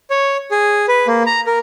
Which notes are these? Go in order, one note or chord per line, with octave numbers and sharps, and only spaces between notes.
C#5
G#4
B4
A#3
A#5
A#4